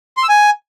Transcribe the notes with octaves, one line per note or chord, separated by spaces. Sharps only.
C6
E6
G#5